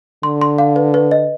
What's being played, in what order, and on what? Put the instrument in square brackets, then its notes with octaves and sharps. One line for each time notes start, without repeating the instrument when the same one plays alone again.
[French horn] D3 [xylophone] C6
[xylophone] C6
F5
B4
B4
D#5